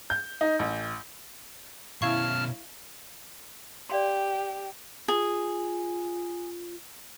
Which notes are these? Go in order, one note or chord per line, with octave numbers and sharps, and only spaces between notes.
G6
D#4
A1
B2 C#4 E4 F5 A5 C#6 F6 G#6
G4 D5 F5 C6
F4 G#4